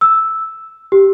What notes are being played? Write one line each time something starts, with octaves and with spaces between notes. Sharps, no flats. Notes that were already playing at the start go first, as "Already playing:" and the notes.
E6
G4